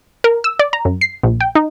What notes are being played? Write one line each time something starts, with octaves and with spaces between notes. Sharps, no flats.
A#4
E6
D5
A#5
F#2
C7
A#1
G5
D#4